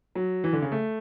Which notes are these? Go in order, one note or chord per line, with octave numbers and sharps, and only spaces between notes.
F#3
E3
D3
C#3
A3